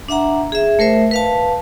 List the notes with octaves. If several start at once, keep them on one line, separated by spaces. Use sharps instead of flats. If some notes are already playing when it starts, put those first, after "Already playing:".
D4 E5 F#5 A#5
G#4 E5
A3 A#4 C5 E5
B4 F5 A5